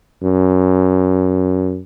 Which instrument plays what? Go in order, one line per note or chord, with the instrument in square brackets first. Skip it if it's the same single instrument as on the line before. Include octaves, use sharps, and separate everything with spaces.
[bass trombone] F#2